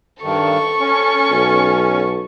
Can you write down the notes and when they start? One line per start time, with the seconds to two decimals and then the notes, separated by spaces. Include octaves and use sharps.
0.23 G2 D#3 A4 C#6
0.80 C#4
1.31 B1